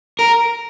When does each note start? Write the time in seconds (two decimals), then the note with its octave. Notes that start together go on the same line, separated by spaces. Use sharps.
0.19 A#4